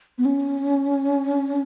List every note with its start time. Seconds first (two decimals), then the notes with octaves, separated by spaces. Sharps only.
0.18 B3
0.25 C#4